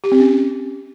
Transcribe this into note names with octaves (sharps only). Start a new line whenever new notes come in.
G4
C4
C#4